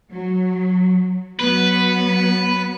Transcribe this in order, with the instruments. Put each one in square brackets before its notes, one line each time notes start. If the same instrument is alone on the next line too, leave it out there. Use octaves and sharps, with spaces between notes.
[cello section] F#3
[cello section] F#3 B3 [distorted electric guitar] B4